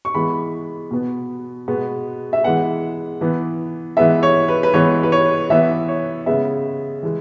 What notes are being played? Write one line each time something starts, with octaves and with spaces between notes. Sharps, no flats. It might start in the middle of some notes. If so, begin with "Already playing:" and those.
C#6
E3 G#3 B3 B5
B2 B3
B2 G#3 B3
E5
E3 G#3 B3 F#5
E3 B3
E3 G#3 B3 E5
C#5
B4
B4
E3 G#3 B3 C#5
B4
C#5
E3 B3 E5
C#5
C#3 G#3 B3 E5
E3 G#3